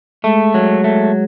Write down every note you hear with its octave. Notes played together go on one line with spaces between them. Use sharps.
G#3 A3
F#3
A3